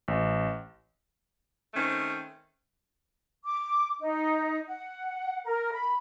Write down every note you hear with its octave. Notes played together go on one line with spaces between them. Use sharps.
A1
D#3 A3 C4 C#4
D6
D#4
F#5
A#4
B5